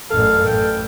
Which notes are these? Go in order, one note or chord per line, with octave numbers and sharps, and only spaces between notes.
A1 F#2 A4 F5
A1 G5